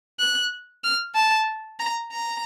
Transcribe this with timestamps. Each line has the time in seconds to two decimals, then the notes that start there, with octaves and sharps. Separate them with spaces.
0.19 F#6
0.84 F6
1.15 A5
1.80 A#5
2.12 A#5